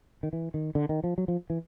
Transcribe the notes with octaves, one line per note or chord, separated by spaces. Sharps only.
D#3
E3
D#3
D3
D#3
F3
F#3
F3
E3